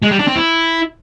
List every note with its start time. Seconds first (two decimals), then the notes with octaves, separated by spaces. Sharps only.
0.03 G#3
0.11 G3
0.19 D4
0.28 C4
0.36 E4